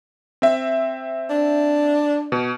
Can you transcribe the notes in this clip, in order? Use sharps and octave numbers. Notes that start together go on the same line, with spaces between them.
C4 E5
D4
B2